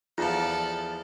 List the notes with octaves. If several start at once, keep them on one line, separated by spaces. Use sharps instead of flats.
E2 F3 F4 A4 D5